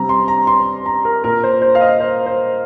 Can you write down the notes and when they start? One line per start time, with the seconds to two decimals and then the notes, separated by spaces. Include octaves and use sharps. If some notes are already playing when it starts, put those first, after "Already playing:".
Already playing: C3 G3 C4 A#5
0.09 C6
0.28 A#5
0.47 C6
0.86 A#5
1.05 A#4
1.24 A#2 A#3 A#4
1.43 C5
1.62 C5
1.75 F5
1.81 D#5
2.00 C5
2.26 C5